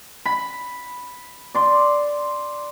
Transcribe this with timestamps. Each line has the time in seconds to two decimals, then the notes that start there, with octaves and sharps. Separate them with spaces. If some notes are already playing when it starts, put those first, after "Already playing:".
0.26 B5
1.55 D5 C6